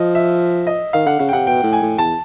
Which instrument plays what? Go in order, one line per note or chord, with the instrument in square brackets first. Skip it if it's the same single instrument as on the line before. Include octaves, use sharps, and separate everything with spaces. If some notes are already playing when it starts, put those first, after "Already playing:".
Already playing: [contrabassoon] F3 [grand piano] D#5
[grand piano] E5
D#5
[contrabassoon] D#3 [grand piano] F5
[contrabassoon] D3 [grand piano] F#5
[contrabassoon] C#3 [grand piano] F5
[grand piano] G5
[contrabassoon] C3 [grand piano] F#5
[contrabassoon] B2 [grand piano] G5
[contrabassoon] A2
[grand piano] G#5
[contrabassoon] A2
[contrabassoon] E2 [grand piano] A5